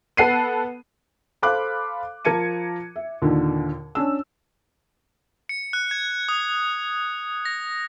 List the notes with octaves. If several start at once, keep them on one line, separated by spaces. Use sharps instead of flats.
B3 A4 F#5 C7 D#7
A4 C5 F5 B5 D6 F#6
F3 A#4 A5 G#6 C#7 D#7
E5
D#2 A#2 D3 D#3
C#4 D4 E6
C#7
F#6
G#6
D#6
A#6